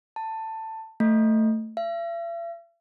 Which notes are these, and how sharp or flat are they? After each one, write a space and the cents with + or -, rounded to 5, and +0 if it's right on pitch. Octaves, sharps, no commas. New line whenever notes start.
A5 +15
A3 +10
E5 +45